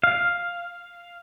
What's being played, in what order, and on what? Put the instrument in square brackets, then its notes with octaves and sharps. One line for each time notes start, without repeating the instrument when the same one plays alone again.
[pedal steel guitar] F5